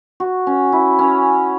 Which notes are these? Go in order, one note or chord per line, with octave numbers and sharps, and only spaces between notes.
F#4
C#4
E4
C#4